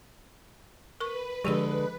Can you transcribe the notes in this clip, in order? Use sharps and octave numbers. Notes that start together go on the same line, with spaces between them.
A#4 B4 C#6
D3 F3 G#3 G4 G#4